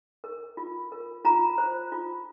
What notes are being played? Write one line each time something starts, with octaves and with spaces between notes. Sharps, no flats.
A#4
F4
A#4
F4 A#5
C5
F4